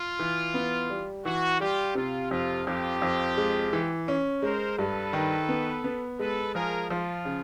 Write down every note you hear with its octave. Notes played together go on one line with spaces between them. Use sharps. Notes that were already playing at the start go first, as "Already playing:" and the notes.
Already playing: F4
E3
B3
G3
E3 F#4
G3 F4 G4
C3 F4
F2 F4
F2 F4 G4
F2
G#3
E3
C#4
G#3 A#4 C5
G2 A4 B4
D#3
B3
B3
G#3 A4 B4
F3 G#4 A#4
F3 F4
C#3